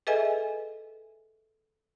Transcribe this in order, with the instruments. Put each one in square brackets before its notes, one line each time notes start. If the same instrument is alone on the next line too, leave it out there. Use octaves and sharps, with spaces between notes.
[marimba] G#4 A4 B4 D#5 E5 G#5